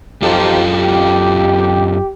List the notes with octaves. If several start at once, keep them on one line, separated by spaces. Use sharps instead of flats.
F#2 F3 D#4 F4 G4 A4
G4